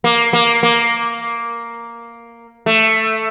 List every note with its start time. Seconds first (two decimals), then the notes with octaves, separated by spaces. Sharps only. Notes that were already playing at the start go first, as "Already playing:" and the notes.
0.04 A#3
0.33 A#3
0.63 A#3
2.66 A3